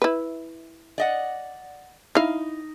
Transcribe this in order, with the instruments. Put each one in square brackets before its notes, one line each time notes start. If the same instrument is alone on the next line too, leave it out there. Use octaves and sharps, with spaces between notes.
[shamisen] E4 B4
[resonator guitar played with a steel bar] D5 D#5 F#5
[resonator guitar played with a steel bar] D#4 [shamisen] E4 F5